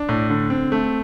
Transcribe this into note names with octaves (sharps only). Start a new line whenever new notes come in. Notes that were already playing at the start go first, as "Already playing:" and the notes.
Already playing: D4
A2
D3
C4
A3